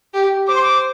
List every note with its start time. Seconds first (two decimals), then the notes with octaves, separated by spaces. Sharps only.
0.14 G4
0.48 C5 D6
0.55 C6
0.62 D6